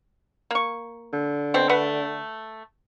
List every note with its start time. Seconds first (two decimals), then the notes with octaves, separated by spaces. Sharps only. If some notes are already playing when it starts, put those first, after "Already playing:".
0.51 A#3 C#6
1.13 D3
1.54 B2 C4
1.69 A3 B4 F#5